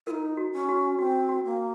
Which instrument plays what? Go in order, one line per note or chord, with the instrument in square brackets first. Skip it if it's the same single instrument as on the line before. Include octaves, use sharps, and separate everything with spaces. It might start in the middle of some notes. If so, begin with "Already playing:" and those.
[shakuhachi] D#4 F4 [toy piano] A#4
[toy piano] F#4
[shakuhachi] C#4
[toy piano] F#4
[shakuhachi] C4 [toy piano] F#4
[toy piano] F#4
[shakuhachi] A#3